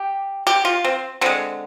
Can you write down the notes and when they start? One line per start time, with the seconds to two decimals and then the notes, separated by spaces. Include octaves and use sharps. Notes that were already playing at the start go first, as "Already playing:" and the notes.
Already playing: G4
0.47 G4
0.65 F4
0.85 C4
1.21 D3 G#3 C4